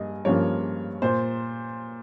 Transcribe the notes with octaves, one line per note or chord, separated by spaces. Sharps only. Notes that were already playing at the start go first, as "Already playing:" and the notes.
Already playing: G2 A#3 D#5 G#5
G2 F3 A#3 C#4 C#5
A#2 C5